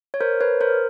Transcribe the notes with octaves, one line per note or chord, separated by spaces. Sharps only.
C#5
A#4 C5
B4 C#5
A#4 C5